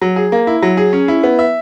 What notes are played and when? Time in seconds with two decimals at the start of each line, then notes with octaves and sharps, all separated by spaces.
0.01 F#3
0.16 G#4
0.32 A#3
0.47 E4
0.62 F#3
0.77 G#4
0.93 C#4
1.08 E4
1.23 B3
1.39 E5